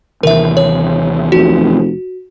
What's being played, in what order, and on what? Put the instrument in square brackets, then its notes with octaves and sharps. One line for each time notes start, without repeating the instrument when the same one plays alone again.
[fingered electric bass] D#2 C3 E3 [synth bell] A#4 E5
[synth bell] C#5
[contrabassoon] F1 [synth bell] F#4